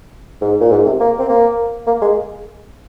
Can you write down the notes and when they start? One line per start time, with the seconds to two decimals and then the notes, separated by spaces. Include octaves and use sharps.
0.41 G#2
0.61 A#2
0.71 G#2
0.85 C3
1.00 A#3
1.19 C4
1.29 A#3
1.87 A#3
2.02 G#3